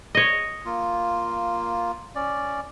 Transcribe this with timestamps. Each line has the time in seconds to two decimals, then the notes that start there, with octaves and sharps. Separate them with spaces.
0.15 C#5 D#5
0.65 A#3 F4
2.15 C#4 D5